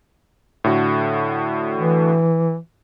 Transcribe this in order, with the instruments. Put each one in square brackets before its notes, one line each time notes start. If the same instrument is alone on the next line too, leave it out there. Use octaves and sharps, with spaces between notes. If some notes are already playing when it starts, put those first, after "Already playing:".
[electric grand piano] A2 D3 F#4
[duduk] E3